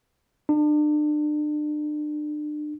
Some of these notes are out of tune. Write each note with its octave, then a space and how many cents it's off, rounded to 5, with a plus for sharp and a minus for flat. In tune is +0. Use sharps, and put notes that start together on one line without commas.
D4 +35